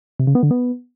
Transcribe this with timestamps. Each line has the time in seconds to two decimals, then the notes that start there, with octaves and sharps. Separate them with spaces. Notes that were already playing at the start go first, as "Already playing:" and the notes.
0.20 C3
0.27 C#3
0.35 B3
0.43 D3
0.51 B3